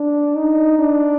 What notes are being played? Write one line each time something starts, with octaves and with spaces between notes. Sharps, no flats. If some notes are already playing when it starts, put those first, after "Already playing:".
Already playing: D4
D#4
D4